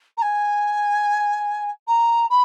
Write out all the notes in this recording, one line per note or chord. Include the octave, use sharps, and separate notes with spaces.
A#5
G#5
A#5
B5